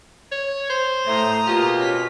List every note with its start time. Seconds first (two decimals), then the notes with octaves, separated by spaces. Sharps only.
0.32 C#5
0.70 C5
1.07 A2 A3 A#5 D#6
1.47 B2 A#3 F4 G4
1.79 C#4 B6